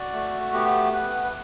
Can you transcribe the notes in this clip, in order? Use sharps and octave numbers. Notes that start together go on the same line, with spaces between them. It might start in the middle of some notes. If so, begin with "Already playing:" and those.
Already playing: F#4 D5
A3
B3 G4
B3 B4
B4